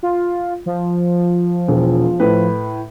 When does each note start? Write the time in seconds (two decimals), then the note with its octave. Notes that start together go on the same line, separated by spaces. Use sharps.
0.03 F4
0.66 F3
1.68 E1
2.19 A2 B4 B5